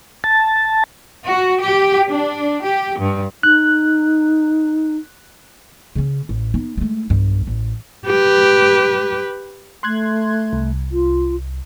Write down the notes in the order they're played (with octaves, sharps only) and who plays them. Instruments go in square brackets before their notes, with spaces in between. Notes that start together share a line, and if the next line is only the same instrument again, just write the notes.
[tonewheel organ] A5
[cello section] F#4
G4
D4
G4
G2
[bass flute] D#4 [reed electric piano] F#6
[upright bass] C#3 C#4
A1
B3 D#4
G#3 A3
B1 G2
A1
[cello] G4 B4
[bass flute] A3 [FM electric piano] C6 F#6 G#6
[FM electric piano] C2
[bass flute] F4